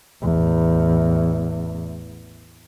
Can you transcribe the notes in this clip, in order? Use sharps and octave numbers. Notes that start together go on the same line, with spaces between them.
A1 E2